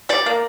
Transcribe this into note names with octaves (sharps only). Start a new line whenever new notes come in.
G3 D5
A#3